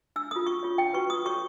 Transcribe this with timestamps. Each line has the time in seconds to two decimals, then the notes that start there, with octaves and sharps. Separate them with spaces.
0.16 D4 E6
0.31 F4 A4 D#6
0.46 C#4 C#6
0.63 F4 A4 C#5
0.78 D4 G5
0.93 F#4 B4 C#6
1.09 F4 D#6
1.25 A4 C#5 C#6